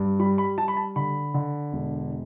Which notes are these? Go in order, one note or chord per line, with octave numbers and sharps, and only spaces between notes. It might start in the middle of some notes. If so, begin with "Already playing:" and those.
Already playing: G2
G3 B5
B5
G3 A5
B5
A5
D3 B5
D3
E1